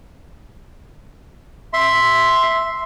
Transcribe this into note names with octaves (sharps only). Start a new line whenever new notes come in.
E5 C6